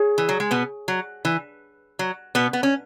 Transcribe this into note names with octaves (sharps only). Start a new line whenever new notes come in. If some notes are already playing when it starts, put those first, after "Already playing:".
Already playing: G#4 C#5
E3
F#3
G#3
B2 B3
F#3
E3
F#3
B2 B3
B3
C#4